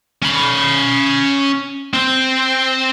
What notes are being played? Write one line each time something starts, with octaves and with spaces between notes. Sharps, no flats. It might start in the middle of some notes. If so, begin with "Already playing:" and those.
C#4 B5
C4